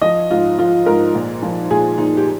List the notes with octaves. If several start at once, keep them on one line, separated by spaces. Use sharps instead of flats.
F3 D#5
G#2 F4
F3 F4
G#2 A#4
A#2
F3
A#2 G#4
A#2 D#4
G4